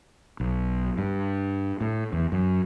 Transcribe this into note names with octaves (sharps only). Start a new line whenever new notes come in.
B1
G2
A2
E2
F#2